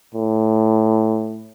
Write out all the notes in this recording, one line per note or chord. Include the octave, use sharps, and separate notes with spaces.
A2